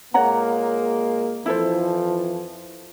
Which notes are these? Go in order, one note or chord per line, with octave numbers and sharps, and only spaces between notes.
A#2 G#3 A#3 C#5 F#5 A#5
F2 E3 F3 E4 A4 C5